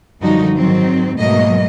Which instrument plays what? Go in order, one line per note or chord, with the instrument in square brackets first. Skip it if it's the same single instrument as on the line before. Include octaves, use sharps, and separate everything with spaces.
[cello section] F#2 D3 F3 G3 D#4 F#4
G#2 D#3 F#3 C4
G#2 B2 F#3 A3 A#3 D#5